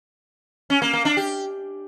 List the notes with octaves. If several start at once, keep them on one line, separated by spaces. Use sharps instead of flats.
C#4
A#3
A#3
D4
G4